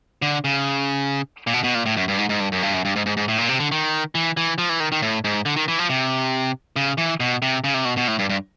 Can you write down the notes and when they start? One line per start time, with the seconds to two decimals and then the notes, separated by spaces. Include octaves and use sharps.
0.22 D3
0.44 C#3
1.47 A#2
1.54 B2
1.64 B2
1.75 A#2
1.86 A2
1.97 F#2
2.08 G2
2.19 G#2
2.29 G#2
2.40 G2
2.52 F#2
2.63 G2
2.73 F#2
2.85 G2
2.96 G#2
3.06 G#2
3.17 G#2
3.28 A2
3.38 A#2
3.49 C3
3.60 D3
3.72 D#3
4.15 E3
4.37 E3
4.58 F3
4.69 E3
4.80 D#3
4.92 D#3
5.02 A2
5.24 G#2
5.46 D3
5.56 D#3
5.68 E3
5.79 F3
5.89 C3
6.76 C#3
6.98 E3
7.20 B2
7.42 C3
7.64 C#3
7.74 C3
7.85 B2
7.97 B2
8.08 A2
8.19 G2
8.30 G2